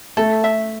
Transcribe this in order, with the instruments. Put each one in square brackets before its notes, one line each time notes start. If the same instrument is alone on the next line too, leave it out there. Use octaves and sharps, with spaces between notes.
[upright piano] A3 [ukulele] A4
[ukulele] E5